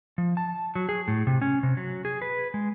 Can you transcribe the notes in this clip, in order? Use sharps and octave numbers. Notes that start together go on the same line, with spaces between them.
F3
A5
F#3
G#4
A2
C3
C#4
C3
F#3
G#4
B4
G#3